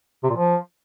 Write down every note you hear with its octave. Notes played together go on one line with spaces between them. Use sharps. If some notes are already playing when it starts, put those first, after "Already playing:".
C3
A#2
F3